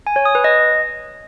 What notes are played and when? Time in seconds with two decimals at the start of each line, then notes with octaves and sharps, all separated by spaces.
0.07 G#5
0.16 C#5
0.25 D#6
0.35 B4
0.44 D#5